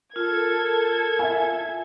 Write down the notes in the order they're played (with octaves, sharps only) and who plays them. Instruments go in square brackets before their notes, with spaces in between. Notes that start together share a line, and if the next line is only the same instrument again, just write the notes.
[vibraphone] F4 [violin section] A4 G#6 [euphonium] A#4
[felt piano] E5 G#5